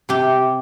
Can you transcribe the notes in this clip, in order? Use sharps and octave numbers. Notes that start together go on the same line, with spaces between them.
C3 G4